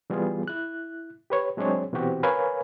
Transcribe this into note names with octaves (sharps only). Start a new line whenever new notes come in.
E3 G3 B3 F4 G#4
E4 F#6
G4 B4 C#5
F#3 G#3 C4 D4 G#4 C#5
B2 E3 C4 F#4 G4
A#4 B4 C#5 F5 G#5 B5